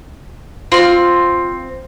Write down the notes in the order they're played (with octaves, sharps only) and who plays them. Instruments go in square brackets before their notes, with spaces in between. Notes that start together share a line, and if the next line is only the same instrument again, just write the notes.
[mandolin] C4 F6 [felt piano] F4